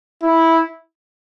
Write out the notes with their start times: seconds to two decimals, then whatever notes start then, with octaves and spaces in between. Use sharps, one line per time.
0.23 E4